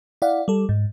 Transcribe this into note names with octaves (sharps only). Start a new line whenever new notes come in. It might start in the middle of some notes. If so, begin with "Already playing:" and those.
E4 D5 F5 F#5
G3 A4
G#2